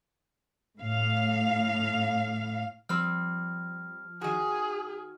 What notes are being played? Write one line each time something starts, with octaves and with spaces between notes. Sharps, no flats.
A2 F5
F3 G3 C4 F6
D#3 F#4 G#4